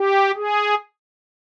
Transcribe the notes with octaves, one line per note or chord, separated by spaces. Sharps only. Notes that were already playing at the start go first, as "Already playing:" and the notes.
Already playing: G4
G#4